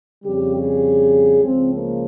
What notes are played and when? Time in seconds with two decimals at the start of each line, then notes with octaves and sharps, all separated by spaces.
0.25 F2 C#3 G3 G4
0.54 G#4
1.42 C#2 C#3 F3 C4
1.72 A#3